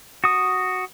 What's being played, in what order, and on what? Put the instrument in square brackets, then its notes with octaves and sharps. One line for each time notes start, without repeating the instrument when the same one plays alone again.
[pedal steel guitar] F#4 D#6